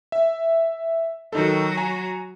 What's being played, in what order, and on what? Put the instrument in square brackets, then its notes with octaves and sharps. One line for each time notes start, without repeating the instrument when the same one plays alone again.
[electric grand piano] E5
[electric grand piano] D#3 D#4 A4 [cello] F#3 F#4
[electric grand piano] G#5 A#5